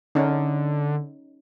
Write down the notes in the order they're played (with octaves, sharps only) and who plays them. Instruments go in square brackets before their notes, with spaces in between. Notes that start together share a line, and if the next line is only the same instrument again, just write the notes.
[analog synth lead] D3 [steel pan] C#4 D#4